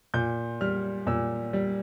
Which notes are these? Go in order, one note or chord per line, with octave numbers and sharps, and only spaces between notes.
A#2 G6
G3 F6
A#2 E6
G3